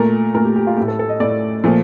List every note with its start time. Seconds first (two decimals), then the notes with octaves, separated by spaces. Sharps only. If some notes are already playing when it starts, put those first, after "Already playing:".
Already playing: A#2 A3 A#4
0.34 A#2 A3 A#4
0.45 G4
0.56 G4
0.67 F4
0.77 A2 A3 G4
0.88 A4
0.99 A4
1.09 D#5
1.20 A2 A3 D5
1.64 A#2 F3 A3